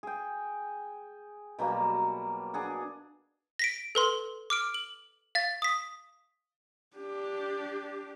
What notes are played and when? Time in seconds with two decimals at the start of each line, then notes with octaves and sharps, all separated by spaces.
0.03 G#4 G5
1.59 B2 F#3 G3 A#3
2.54 D4 G#4 F#5
3.59 A#6 B6 D7
3.95 A4 B4 C6
4.50 D6 F6 D7
4.74 F#7
5.35 F5 A6
5.62 D#6 B6
6.97 D4 G4